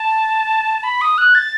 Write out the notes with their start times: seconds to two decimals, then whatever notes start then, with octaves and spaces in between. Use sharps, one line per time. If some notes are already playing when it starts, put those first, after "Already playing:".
Already playing: A5
0.83 B5
1.01 D#6
1.18 F#6
1.35 A6